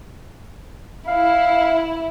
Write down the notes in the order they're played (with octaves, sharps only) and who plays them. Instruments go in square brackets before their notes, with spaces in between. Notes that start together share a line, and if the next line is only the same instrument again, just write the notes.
[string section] E4 [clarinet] F5